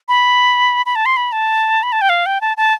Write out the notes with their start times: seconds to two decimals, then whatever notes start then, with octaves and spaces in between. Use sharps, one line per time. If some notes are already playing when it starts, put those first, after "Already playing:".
0.08 B5
0.86 B5
0.96 A5
1.06 C6
1.17 B5
1.32 A5
1.83 B5
1.92 A5
2.01 G5
2.09 F5
2.26 G5
2.41 A5
2.57 A5